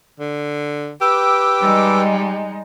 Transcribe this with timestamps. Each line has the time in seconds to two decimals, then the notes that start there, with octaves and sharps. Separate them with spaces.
0.20 D3
1.01 G4 B4 G5 D6 E6
1.62 G3 G#3 D#4